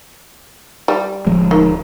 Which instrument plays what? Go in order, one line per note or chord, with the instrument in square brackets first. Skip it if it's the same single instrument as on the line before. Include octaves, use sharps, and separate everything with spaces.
[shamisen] G3
[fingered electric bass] D1 F3 G#3
[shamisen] D#3